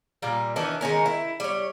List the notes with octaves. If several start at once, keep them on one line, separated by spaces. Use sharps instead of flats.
A#2 G3 A#3
D#3 E3 C#4 D4
D#3 G#3 C#4 A#4
E4
G3 C#5